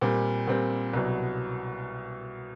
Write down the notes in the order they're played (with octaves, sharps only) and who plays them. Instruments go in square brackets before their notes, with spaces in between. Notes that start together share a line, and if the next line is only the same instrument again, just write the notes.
[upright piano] A#2 G3 C4
A#2 G3 C4
C2 B2 F#3